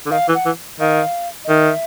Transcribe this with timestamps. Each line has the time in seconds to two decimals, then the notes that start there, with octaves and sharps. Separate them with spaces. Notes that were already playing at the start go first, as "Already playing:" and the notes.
0.06 D3
0.11 D#3 F5
0.29 E3
0.35 F#5
0.46 E3
0.80 D#3 F5
1.45 D#5
1.49 D#3 E5